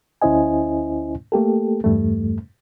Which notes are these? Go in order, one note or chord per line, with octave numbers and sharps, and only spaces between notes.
D2 C#4 E4 C5 D#5 G#5
A3 A#3 G4 A4
E2 G2 G3 A3